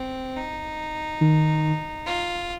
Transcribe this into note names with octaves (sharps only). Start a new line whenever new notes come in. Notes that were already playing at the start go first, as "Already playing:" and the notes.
Already playing: C4
D#4
D#3
F4